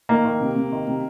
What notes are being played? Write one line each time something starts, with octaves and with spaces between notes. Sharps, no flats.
D#3 A#3
D#3
C3
C3
D#3
C3